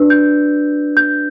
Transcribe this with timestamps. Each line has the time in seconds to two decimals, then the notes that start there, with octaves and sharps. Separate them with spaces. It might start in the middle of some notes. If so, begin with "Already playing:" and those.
Already playing: D4 F#4 B4 D5 E6
0.10 G6
0.97 G6